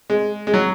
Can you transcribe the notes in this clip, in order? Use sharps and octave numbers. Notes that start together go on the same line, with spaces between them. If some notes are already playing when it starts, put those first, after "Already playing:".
G#3
G#3
F#3